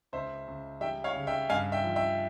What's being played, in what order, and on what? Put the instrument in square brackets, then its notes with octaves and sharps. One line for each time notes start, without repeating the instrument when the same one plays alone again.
[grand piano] C#2 C5 E5
C#2
G3 E5 G5
C#5 F5
C#3
E5 G5
G2 F5 G#5
E5 G5
F3
E5 G5